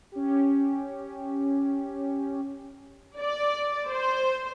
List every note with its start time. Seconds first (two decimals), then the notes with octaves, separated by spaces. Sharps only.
0.12 C#4 G4
3.20 D5
3.91 C5